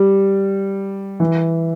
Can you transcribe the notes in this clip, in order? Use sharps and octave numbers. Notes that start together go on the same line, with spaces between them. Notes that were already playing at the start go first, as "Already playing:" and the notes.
Already playing: G3
E3